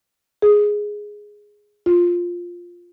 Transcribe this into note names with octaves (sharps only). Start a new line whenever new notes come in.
G#4
F4